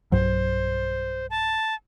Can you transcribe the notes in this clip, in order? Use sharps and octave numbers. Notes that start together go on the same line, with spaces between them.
B1 G2 F#3 C5
A5